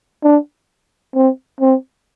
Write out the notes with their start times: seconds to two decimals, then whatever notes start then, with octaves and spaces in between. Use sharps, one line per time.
0.23 D4
1.15 C4
1.61 C4